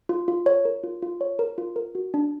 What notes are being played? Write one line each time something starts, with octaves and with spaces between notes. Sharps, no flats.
F4
F4
C#5
A#4
F4
F4
C#5
A#4
F4
A#4
F#4
D4